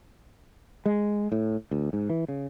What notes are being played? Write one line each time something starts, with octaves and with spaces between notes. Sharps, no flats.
G#3
A2
D2
G#2
E3
C#3